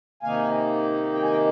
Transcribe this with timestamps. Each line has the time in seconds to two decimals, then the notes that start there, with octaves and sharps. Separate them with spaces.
0.23 C3 D#3 A#3 D#4 F5 G#5
1.14 G5
1.23 G#5
1.32 D#5 G5